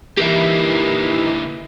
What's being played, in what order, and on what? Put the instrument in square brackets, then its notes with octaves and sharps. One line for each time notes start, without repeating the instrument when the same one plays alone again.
[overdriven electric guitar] D3 A#3 [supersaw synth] E3 D#4 E4 [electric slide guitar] G4 A#4 E5